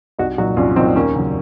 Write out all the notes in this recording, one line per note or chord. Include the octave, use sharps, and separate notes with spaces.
C2 D#4 F#4
A#2 F#3 D#4 F#4
C2 C#4 F4
A#2 F#3 C4 D#4
D#2 A#3 C#4
C#3 F#3